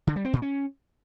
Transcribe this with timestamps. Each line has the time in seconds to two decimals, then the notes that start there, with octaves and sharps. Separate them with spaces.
0.07 D3
0.16 G3
0.25 C4
0.33 A#2
0.42 C#4